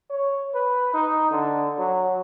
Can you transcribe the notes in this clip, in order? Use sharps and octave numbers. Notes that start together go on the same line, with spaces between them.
C#5
B4
D#4
D3
F#3